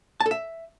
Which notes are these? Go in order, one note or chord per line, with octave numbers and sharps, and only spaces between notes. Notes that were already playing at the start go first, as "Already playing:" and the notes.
A5
A4
E5